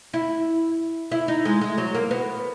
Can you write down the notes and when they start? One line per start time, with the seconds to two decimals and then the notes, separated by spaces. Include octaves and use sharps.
0.14 E4
1.11 E4
1.28 D#4
1.45 G#3
1.61 G#3
1.78 F#3
1.95 A#3
2.11 B3